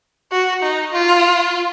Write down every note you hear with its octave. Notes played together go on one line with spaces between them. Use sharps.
F#4
D#4
F4